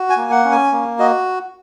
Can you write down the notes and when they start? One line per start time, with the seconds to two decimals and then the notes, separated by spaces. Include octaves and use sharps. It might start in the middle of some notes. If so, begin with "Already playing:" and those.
Already playing: F#4
0.10 G#5
0.17 A#3
0.31 F#5
0.45 C#4
0.52 G#5
0.72 A#3
0.99 F#4 D#5